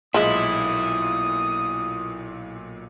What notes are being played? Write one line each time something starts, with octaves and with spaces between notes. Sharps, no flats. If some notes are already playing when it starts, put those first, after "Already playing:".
B1 A#2 F3 G#3 E4 D#6